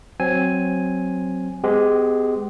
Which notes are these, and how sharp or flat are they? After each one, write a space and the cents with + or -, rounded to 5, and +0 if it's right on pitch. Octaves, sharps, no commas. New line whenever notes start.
F#3 +0 C4 +5 G#5 +0
G#3 +0 B3 +45 G4 +0